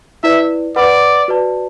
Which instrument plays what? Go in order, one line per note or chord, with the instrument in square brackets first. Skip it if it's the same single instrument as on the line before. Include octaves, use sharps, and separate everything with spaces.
[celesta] E4 B4 D5 [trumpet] E5
[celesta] B4 F#5 B5 D6 [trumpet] D5
[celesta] F#4 B4 D5 A5